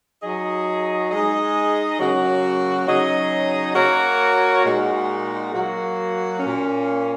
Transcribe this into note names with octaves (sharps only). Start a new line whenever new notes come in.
F#3 D#4 G#4 D#5
G#3 D#4 G#4 D#5
C#3 F#3 A#3 F#4
C#3 F#3 D#4 G#4 D#5
A#3 F#4 A#4 C#5
A#2 G#3 D#4 F#4
F#3 A#3 F#4
A#2 A#3 C#4